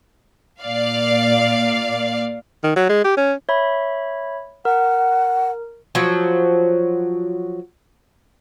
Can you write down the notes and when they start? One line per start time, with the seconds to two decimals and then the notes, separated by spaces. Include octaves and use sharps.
0.61 A#2 D5 F5
2.64 D#3
2.76 F#3
2.89 G#3
3.04 G4
3.17 C#4
3.49 C#5 E5 B5
4.65 A#4 F#5
5.95 F3 F#3